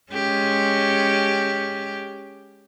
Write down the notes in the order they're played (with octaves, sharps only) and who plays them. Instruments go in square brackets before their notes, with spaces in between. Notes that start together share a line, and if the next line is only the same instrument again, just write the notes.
[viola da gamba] G#3 C#4 G4